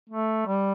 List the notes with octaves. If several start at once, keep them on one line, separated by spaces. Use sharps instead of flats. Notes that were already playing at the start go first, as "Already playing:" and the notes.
A3
G3